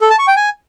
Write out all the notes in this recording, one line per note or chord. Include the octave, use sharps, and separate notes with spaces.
A4
A5
C#6
G5
G#5